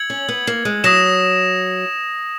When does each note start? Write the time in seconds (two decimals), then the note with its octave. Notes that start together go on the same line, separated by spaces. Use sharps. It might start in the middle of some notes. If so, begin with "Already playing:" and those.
Already playing: E6 G#6 C#7 F#7
0.10 C#4
0.29 B3
0.47 A#3
0.65 G#3
0.84 F#3 D#6 A#6 E7